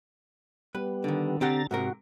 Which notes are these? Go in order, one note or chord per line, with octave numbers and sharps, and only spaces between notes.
G3 B3 B4
D3 D#3
D3 C4 G4 F#5 A#5 A6
G#2 C3 F#4 A#4